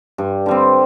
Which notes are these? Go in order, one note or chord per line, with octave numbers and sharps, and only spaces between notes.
G2
D3 G3 C4